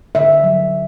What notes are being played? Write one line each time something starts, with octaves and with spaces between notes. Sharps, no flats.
D3 E5
F#3